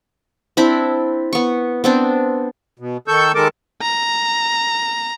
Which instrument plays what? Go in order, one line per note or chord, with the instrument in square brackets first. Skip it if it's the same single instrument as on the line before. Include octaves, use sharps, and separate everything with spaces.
[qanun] C4 D4 E4 B5
B3 C#6
B3 C4 D4
[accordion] B2
D#3 A4 C#6 E6 G6
D#3 G#3 A4 A#4 A5 D6
[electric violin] A#5